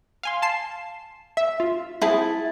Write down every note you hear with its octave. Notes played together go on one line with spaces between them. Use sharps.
F5 G#5 C6
A5 C7 E7
E5
F4
C4 E4 G#4 A5